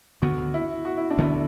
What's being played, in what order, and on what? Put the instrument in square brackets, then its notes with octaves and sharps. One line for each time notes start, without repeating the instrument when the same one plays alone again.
[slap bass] D2 D3 B3 [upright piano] F#4
[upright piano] E4
F#4
E4
D4
[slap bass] D2 D3 B3 [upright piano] E4